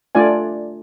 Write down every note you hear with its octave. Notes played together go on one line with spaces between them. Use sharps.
A3 D4 F4 D5 G#5